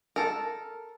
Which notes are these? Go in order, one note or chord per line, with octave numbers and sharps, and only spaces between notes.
A4 A#4